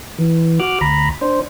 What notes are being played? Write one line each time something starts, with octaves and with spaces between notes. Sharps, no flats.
E3
F#4 D6 F6 F#6
D2 A#5 B5
D4 C5